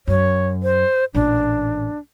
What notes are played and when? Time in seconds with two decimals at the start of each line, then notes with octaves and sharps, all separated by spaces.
0.08 F#2 C#5
0.63 C5
1.15 A1 A#2 D4